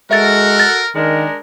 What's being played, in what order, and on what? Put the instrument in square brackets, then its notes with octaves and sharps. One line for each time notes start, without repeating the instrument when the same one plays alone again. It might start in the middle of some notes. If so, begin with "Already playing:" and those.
[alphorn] G#3 [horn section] F#4 A4 F#5 [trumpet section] A#4 [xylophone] E5 A6
[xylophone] A6
[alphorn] D#3 [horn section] G#3 D4 A#4